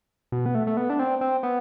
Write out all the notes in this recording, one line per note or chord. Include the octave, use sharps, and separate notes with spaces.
B2
B3
A3
A3
B3
D4
C4
C4
B3